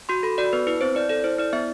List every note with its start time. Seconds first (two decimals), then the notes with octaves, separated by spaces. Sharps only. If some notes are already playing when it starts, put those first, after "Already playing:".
0.09 F#4 C6
0.23 A4 B5
0.38 F#4 D5
0.53 B3 B4
0.67 E4 B4
0.81 C4 C5
0.95 E4 D5
1.09 A4 D5
1.24 E4 C5
1.38 E4 D5
1.53 B3 E5